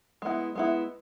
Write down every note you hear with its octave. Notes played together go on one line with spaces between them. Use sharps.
G#3 B3 E4
G#3 B3 E4